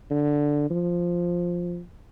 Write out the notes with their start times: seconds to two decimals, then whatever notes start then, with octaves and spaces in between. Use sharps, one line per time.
0.11 D3
0.71 F3